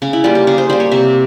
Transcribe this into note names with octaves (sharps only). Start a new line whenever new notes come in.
C#3 C#4
E4
G3 A#3 F4
G4
C#3 G#4
C5
G3 A#3 C5
C#5
C3 E5